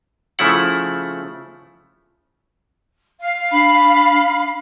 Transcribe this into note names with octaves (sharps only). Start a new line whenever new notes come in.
C#3 F3 A3 E4 F#5
F5
D4 B5